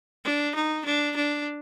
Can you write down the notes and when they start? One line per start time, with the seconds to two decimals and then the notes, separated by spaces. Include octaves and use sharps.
0.25 D4
0.55 D#4
0.85 D4
1.16 D4